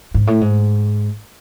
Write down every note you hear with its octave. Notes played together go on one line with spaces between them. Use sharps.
G#2
A2
G#2